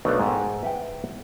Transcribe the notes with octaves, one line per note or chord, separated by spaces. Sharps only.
B1 A3 B3 D4 A#4
G#2 G#4 G5
B4 E5 F#5 G5